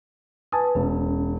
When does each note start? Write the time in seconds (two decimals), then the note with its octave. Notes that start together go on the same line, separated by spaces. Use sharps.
0.52 B4 G#5 A5 D#6
0.75 E1 C#4